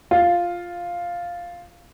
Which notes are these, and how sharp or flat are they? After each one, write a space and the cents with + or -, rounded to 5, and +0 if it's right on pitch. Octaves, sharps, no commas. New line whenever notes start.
F4 +0